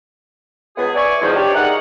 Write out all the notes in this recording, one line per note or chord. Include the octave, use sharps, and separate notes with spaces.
C#2 B3 G#4
D5 E5 G#5 C#6
E2 G#2 D#3 F3
D4 G4 C#5 D5
D#4 G#4 A#4 E5 F#5